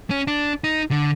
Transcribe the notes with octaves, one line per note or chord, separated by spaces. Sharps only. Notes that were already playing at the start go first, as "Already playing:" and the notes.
C#4
D4
D#4
D3